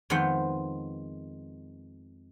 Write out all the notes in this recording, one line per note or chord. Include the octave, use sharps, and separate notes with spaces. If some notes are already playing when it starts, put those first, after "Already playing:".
F2 D#3 G#3 B3 C5 F#5